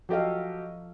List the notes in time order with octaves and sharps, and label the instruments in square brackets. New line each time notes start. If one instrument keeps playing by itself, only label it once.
[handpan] F3 A4 F5 [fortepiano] F#3 G4 D#5